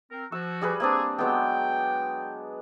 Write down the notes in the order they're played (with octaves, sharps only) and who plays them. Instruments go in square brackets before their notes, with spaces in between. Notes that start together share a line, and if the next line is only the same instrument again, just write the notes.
[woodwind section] C4 A#4
[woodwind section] F3 F#4 [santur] E6
[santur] G3 G#4 B4
[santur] A#3 C4 D4 [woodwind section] G#4
[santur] F#3 G#3 B3 [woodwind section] G5